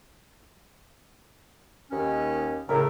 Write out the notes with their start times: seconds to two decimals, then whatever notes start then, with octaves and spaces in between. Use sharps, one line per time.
1.92 D#2 C#4
2.69 A2 C#3 A#4 E5